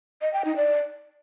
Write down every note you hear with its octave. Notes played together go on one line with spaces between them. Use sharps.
D#5
G5
D#4
D5